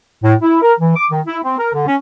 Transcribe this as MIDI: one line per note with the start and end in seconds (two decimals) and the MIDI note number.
0.23 0.34 45
0.41 0.59 64
0.62 0.73 70
0.79 0.95 52
0.95 1.05 86
1.10 1.20 51
1.26 1.38 64
1.43 1.58 60
1.59 1.69 70
1.74 1.86 50
1.86 1.95 61